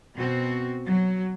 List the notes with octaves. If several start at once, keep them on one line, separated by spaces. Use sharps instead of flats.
B2 C4 F#4
F#3